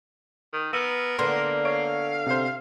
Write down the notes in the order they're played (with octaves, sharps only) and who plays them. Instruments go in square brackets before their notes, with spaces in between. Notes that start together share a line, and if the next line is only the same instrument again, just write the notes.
[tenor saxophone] D#3
[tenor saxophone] B3 [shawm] A#4 [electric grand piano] E6 D#7
[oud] D3 B3 [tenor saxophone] A#3 [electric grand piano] C6
[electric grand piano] C#5 C#6 D7 [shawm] F5
[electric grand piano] C3 C5